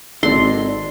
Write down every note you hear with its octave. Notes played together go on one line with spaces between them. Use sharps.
G#1 A4 D5 D#5 C6